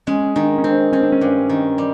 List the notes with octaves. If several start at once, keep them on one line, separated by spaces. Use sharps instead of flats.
G#3 C#4
D#3 D4
C#4
C4 D4
C4 C#4
D4
C#4
G2
D#3
G3